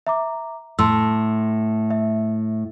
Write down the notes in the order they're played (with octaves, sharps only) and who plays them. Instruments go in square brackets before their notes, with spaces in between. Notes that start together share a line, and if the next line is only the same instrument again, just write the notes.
[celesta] E5 A#5 D6
[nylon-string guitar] A2 [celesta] A5 C6 E6
[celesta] E5